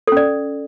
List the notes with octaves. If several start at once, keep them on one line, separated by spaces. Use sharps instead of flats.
C#4 A4 D5